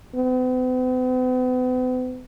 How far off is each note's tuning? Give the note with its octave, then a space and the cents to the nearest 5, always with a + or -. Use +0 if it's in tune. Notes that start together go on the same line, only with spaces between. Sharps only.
B3 +45